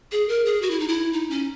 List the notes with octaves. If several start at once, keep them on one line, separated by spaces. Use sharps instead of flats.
G#4
A#4
G#4
F#4
E4
D#4
E4
D#4
C#4